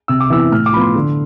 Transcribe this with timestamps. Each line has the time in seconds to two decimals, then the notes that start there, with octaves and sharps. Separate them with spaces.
0.08 C3 E6
0.20 D6
0.30 E3 B3 E4 E6
0.51 A2 F6
0.66 D6
0.73 F3 B5
0.76 B3 C6
0.95 D3